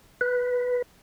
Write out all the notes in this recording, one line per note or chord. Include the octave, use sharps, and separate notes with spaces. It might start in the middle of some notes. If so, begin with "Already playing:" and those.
B4